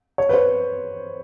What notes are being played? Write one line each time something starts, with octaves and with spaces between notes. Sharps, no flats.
C#5
B4
C5